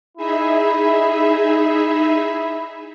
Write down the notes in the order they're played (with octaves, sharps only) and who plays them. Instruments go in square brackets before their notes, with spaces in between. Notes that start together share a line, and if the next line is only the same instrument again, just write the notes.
[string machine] D#4 G#4 E5 [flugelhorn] E4